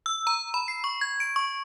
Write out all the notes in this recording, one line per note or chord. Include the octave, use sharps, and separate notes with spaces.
E6
A#5
B5
C7
C#6
G#6
D7
C#6